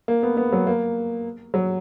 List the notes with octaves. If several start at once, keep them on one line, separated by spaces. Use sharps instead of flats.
A#3
B3
B3
F#3
A#3
F#3